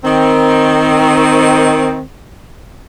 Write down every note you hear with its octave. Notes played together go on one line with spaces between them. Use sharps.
D#3 C4